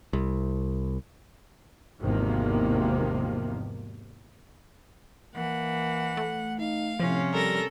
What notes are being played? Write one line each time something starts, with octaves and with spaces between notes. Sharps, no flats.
C2
G#1 E2 C3 D#3 F3 A#3
E3 A#3 F#5
A3
D#4 F5
A2 C3 F3 C#4
G3 A4 A#4 A#6